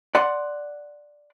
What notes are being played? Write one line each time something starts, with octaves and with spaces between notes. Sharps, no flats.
D5 F#5 C6